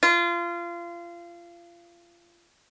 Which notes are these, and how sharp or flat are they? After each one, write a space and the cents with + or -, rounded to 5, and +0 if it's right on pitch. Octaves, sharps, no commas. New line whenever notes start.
F4 -25